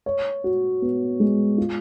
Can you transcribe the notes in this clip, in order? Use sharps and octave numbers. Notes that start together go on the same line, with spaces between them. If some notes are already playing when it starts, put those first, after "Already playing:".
C#5
F#4
B3
G#3
F4